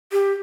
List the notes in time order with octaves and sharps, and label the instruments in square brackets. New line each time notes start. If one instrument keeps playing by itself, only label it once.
[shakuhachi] G4